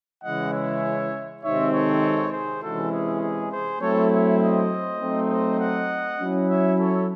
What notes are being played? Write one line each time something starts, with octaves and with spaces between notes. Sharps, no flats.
C#3 E3 G#3 C#4 E4 D#5 F#5
C#5 E5
C3 D#3 G#3 C4 D#4 C#5 E5
A4 C#5
G#4 C5
C3 E3 G#3 C#4 E4 F#4 A4
G#4
G#4
G#4 C5
F#3 A3 C4 E4 A4 C#5
C#5 E5
C5 D#5
F#3 A3 C4 D#4
C5 D#5
D#5 F#5
F#3 C#4 E4
C#5 E5
A4 C#5